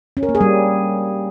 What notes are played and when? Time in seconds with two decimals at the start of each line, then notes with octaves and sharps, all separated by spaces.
0.17 C#4
0.23 A#4
0.29 A#3
0.35 G#4
0.41 G3